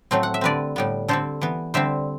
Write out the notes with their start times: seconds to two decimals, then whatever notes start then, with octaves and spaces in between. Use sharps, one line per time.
0.11 A2 F#3 A3 C4
0.23 F#5
0.34 E5
0.41 D3 G3 C4 B4 D5
0.76 A2 G3 B3
1.08 D3 G3 C4 A4 C5
1.42 E3 B3
1.74 D3 G3 C4 C5 E5